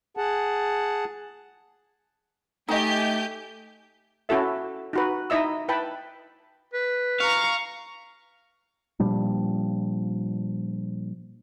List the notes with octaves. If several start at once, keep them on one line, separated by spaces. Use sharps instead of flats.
G#4 F#5 A5
A3 D#4 G4 D#5 G#5 G6
C#4 E4 F#4 A4 E5
D#4 F#4 B4
D#4 E4 D#5 E5 E6
E4 B4 G5 A5 B5
B4
F5 A#5 C#6
A#2 F3 G3 D4